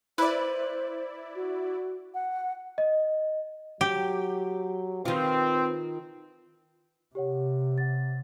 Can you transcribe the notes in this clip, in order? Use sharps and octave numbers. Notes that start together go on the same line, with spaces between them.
E4 B4 C5 D5
F#4
F#5
D#5
F#3 G4
D#3 C4 F4 B4
C3 G4 C#5 F#5
F#5 A6